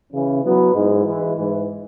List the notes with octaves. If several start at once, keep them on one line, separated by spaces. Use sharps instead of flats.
C#3 E3 C#4
F#3 B3 E4 B4
G#2 G#3 E4
E3 G#3 E4 B4
G#2 E3 G#3